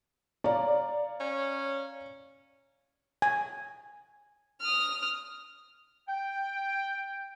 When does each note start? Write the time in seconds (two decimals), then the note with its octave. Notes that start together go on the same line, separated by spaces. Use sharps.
0.44 C#5 D5 F5 A#5
1.20 C#4
3.22 G#5
4.61 D#6 F6
6.08 G5